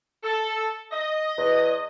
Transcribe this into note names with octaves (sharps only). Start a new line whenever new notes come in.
A4
D#5
E2